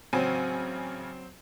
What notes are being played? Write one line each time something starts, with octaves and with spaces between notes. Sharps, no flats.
A1 C#3 F#3 C4 G#5